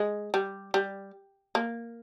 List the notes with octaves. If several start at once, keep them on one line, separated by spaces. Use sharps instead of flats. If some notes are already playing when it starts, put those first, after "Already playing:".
Already playing: G#3
G3
G3
A#3